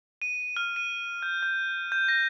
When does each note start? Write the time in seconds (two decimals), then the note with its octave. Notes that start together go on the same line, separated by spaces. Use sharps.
0.22 D#7
0.57 F6
0.76 D#7
1.22 G6
1.43 G6
1.92 G6
2.08 A#6